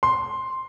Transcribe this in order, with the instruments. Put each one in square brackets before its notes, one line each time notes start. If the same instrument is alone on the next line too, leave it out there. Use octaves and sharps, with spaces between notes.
[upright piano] C6